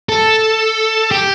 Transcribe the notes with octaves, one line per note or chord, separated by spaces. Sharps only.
A4
G4